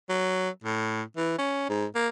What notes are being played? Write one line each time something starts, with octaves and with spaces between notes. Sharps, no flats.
F#3
A2
E3
C#4
G#2
A#3